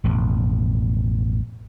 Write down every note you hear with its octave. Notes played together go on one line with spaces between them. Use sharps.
A1 F2 B2